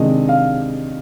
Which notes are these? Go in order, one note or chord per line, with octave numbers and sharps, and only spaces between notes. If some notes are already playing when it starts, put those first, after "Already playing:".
Already playing: C3 D#3 G#3 D4 D#5
F5